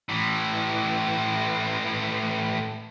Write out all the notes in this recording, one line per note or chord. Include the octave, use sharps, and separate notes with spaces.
A2 E3